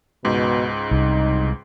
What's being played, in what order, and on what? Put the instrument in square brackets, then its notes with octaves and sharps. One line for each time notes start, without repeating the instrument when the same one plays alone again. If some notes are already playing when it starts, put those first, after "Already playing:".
[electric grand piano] C#2 G#2 [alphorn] B2
[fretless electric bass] C2 [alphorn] D#4